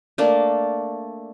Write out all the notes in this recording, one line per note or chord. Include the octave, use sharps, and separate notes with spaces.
A3 A#3 D4